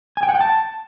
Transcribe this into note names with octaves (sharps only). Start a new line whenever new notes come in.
G#5
G5
F#5
G5
A5